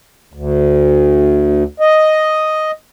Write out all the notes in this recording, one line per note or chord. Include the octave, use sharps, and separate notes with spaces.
D2
D#5